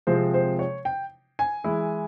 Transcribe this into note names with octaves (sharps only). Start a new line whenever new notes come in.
C3 F3 G#3 C4 C5
C5
C#5
G5
G#5
E3 G#3 E4